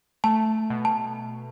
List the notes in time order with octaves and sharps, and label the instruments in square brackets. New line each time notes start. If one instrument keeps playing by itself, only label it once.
[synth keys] A3 [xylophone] A5
[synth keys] B2
[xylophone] A5